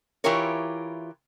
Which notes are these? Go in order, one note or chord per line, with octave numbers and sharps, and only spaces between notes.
E3 E4 F4 G4 A#4 C#5